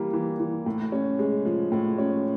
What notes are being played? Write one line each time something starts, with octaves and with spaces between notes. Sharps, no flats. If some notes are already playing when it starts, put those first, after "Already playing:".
Already playing: E3 G3 A#3
E3
E3
A2
C#4
G#3
F3
A2
C#4